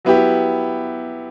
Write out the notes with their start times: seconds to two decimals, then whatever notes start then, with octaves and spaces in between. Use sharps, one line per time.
0.05 F#3 B3 E4 G4